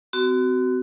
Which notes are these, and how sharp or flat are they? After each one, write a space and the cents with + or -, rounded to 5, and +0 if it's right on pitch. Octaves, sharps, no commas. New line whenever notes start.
C4 -35 F#4 +20